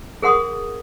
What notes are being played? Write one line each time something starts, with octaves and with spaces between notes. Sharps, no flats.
G#4 A#4 F#5 C6 D#6